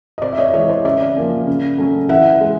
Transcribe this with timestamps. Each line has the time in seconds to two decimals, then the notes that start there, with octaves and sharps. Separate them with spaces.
0.18 D#5
0.22 C3 C5 D5
0.32 E5
0.38 C#5 D#5
0.54 E3 G#3 C#5 D#5
0.69 C5 D5
0.85 C#3 D5 E5
1.17 F3 A#3 C#4
1.47 C#3
1.78 F#3 A3 C#4
2.09 E3 E5 F#5
2.41 G#3